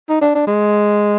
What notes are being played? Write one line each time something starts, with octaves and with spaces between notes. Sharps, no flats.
D#4
D4
D4
G#3